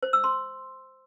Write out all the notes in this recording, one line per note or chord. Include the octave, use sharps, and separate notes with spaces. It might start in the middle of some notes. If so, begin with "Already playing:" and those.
C5
E6
C6